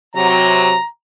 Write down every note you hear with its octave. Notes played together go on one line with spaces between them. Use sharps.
C3 F#3 A#5